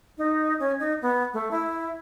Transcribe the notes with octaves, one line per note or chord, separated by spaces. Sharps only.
D#4
C#4
D#4
B3
A3
E4